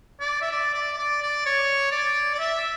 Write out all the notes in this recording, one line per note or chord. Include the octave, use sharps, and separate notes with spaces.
D5
E5
D5
D5
D5
D5
C#5
D5
D5
E5